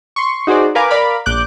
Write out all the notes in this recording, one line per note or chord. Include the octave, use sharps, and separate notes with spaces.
C6 C#6
D#4 F#4 G#4 C5 D5
A#4 B4 F5 G#5 D6
A#4 D5 F5 B5
A#1 D6 F#6 G6